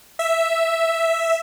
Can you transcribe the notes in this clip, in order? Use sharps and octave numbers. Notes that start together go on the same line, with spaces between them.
E5